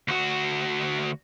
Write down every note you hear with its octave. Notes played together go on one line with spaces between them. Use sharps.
D2 F#4